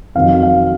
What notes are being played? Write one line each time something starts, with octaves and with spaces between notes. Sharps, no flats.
F2 D#3 F#3 F5
F5